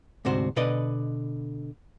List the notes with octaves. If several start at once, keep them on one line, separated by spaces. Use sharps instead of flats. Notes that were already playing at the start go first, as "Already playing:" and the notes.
D2 G#2 C3 F#4 C5
B2 D3 B4 D5 D#5